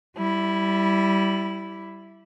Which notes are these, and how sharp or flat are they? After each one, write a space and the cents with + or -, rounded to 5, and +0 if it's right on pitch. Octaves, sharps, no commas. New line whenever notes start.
G3 -15 E4 +0